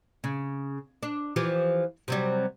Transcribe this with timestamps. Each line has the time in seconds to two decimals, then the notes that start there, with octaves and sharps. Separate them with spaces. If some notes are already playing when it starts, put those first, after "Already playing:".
0.24 C#3
1.03 D4
1.36 E3 F3 G4
2.08 C3 F#3 G3